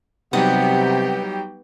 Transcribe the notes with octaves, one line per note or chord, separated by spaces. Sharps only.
C3 F#3 G3 B3 D#4 G4 G5